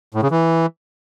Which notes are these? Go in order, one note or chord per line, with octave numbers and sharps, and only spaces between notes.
A2
C#3
E3